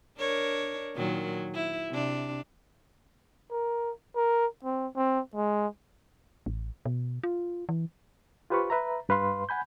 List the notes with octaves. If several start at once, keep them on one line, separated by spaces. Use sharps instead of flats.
D4 A#4 C#5
A#2 D#3 F#3
E4
C3 D4
A#4
A#4
C4
C4
G#3
A1
B2
F4
E3
F4 G4 B4 C5 F5 C#6
B4 E5 A#5
G2 B4 F5 C6
F#5 G#5 B5 G6